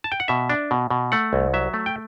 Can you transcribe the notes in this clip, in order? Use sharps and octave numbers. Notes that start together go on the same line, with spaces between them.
A5
G5
F#5
B2 E5
D4
B2
B2
A3 F#5
C2
F#3 E5
A3
G5